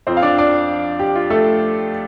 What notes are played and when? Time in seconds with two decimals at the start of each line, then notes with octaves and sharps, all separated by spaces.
0.07 F2 F3 C4 C5
0.17 F5
0.22 D4 D5
0.38 D4 D5
0.99 G4
1.16 F4
1.30 A3 A4